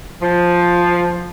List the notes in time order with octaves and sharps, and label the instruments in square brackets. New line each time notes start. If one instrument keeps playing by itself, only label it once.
[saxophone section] F3